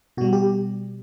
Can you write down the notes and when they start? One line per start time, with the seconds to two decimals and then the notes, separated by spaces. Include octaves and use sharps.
0.17 B2 F#4
0.21 G3
0.33 G4